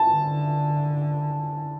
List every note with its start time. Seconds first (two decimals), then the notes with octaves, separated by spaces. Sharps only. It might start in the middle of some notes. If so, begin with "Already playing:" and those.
Already playing: A5
0.13 D3